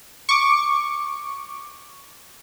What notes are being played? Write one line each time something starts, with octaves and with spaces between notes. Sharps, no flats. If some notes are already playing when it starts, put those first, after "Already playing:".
C#6 D6